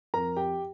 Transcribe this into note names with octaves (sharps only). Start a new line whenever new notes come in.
F2 A#4 A#5
G4 G5